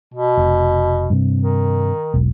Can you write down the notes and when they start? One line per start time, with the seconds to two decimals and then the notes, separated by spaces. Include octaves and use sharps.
0.14 B2
0.37 F1
1.10 G2 C3
1.41 D#3
2.14 E1 B1